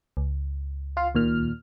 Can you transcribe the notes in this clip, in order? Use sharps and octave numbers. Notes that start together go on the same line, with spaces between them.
C#2
F4 F5
D#2 A#2 F6